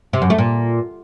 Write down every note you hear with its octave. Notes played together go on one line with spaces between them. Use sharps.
C3
F#2
A3
A#2